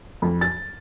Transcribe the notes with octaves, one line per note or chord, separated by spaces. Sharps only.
F2
A6